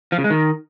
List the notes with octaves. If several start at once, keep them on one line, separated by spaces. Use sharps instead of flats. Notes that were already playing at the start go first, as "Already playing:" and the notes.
F3
C#3
G#3
D#3